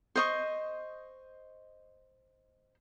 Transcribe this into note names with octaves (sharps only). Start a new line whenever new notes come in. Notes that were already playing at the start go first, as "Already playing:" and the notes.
C5 D#5 C#6